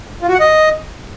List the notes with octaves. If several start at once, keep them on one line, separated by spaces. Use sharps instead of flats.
F4
F#4
F#5
D#5